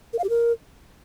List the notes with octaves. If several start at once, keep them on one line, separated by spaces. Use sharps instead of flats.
A#4
F5
G4
A#4